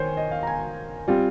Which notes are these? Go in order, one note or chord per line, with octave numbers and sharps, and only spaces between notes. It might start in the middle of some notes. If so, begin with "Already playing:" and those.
Already playing: D#3 C5 C#5 G#5
D#5
F5
A#5
G#5
G3 C4 F4